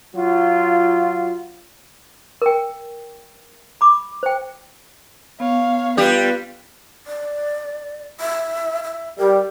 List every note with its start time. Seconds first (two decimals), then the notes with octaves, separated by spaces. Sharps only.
0.15 F#3 F4
2.42 A#4 G5
3.81 B5 D6
4.23 C5 G5
5.40 B3 C#5 F5
5.97 G3 F4 G4 B4
7.07 D5
8.20 E5
8.84 E5
9.18 G3 A#4